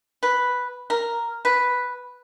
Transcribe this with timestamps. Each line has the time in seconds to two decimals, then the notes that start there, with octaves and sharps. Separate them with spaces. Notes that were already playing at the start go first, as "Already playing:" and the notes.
0.23 B4
0.90 A#4
1.45 B4